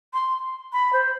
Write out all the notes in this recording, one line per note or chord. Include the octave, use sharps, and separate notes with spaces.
C6
B5
C5